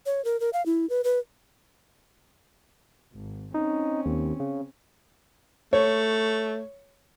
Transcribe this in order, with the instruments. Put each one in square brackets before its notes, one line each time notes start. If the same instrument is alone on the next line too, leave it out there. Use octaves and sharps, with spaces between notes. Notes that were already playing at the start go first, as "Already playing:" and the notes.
[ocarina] C#5
A#4
A#4
F5
E4
B4
B4
[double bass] G#1
[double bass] C4 C#4 [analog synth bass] D#4
[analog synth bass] D#2
C#3
[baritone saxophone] A3 [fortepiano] C#5